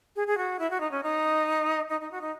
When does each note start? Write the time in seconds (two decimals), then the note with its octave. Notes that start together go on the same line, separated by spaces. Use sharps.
0.16 G#4
0.27 G#4
0.38 F#4
0.59 E4
0.71 F#4
0.81 D#4
0.91 C#4
1.03 D#4
1.90 D#4
2.01 D#4
2.11 F#4
2.21 D#4